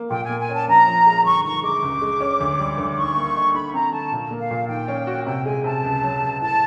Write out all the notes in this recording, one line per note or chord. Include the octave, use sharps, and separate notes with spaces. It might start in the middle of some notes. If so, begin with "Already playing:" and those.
Already playing: A#3
A#2 G5
A#3 G#5
G#5
C#4 A5
A#1 A#5
F3
G#3
G1 C#6
D#3 C#6
G#3 D6
C#2
G#3
C#4
D2
G3
D2
D#3 C#6
A#3
D#4
D3 B5
C4 A#5
D3 A5
A#2
A#3
F5
A#2
D#3 G5
C#4
F#4
C3 G5
G#3 G#5
C3 A5
C#2
F#3
C#2
A2 A5